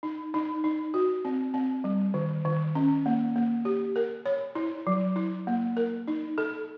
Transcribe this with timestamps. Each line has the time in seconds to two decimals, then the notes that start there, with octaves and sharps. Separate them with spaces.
0.03 D#4
0.34 D#4
0.64 D#4
0.94 F#4
1.25 C4
1.54 C4
1.84 G3
2.14 D#3
2.45 D#3
2.75 C#4
3.06 A#3
3.36 A#3
3.65 G4
3.96 A#4
4.26 C#5
4.55 E4
4.87 F#3
5.16 E4
5.47 A#3
5.77 A#4
6.08 D#4
6.38 A4